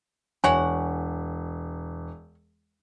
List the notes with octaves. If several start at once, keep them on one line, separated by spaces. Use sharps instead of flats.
E1 F#4 C#5 F#5 G#5